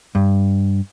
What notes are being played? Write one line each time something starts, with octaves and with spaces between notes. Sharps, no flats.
G2